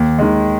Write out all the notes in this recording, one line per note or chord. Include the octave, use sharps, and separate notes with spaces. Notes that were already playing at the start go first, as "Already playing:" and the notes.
Already playing: D#2
D#3 G#3